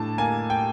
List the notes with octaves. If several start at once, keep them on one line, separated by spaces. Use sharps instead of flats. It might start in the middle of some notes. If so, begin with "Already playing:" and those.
Already playing: A2 D4 A5
A#3 G#5
G5